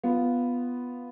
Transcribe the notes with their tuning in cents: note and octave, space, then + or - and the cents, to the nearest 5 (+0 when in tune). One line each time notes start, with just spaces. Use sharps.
B3 +0 F4 +0